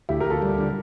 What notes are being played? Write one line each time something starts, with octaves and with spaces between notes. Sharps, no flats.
D2 E4 G4
G4 A#4
D2
F4 A4
G3
D3